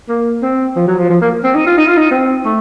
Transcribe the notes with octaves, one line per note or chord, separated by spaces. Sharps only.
A#3
C4
F3
F#3
F3
F3
A#3
C4
D#4
F4
D#4
F4
D#4
C4
A3